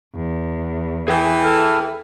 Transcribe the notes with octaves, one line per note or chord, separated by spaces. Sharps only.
E2
E3 G#4 G5
A4 F6